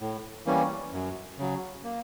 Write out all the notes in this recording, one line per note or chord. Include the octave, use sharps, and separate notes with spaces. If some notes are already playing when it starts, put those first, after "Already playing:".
A2
E3 G3 A#3 C#4
F#2
C#3 F#3
A#3